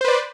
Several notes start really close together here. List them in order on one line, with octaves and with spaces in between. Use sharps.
C5 B4 D5